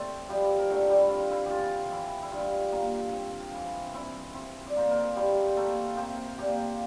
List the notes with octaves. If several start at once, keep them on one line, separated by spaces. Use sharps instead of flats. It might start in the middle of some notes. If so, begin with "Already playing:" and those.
Already playing: A3 C4 A4 C5 D5 E5
F3 G3 G4
A#4
D3 A3 A4
G3 G4
C4 F4
E4
E3 F4 G4
E3 E4
E4
G2 F4
A#3
C4
E3
C4 E4
C4
D5
A#3 C5
A#4
A4
G3 E4 G4
A3 A#3 A4
A#3 C4 C5
A#2 G4 G5